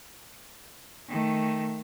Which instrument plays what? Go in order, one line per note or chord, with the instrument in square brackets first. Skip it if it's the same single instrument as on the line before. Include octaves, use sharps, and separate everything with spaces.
[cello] D#3 A3